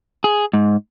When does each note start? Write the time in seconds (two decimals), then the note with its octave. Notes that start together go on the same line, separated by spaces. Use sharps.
0.24 G#4
0.53 G#2